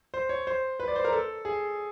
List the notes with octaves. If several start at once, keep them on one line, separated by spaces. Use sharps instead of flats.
C5
C#5
C5
B4
D5
C5
A#4
A4
G#4